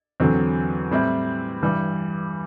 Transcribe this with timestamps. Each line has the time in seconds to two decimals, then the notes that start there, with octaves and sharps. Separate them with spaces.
0.20 E2 D3 F#3 C4
0.91 A2 G3 C4 E4
1.62 G2 E3 G3